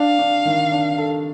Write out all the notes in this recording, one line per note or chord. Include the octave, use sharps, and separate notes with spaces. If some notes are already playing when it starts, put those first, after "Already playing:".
Already playing: D4 F5
D4
D#3
D4
A4